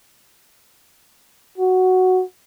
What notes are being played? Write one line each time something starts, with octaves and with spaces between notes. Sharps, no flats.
F#4